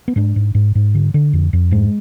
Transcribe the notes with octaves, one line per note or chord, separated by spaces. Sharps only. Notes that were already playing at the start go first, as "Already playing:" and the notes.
B3
G#2 D4
G#2
G#2
G#2
D3
D3
F2
F2
G#2 G#3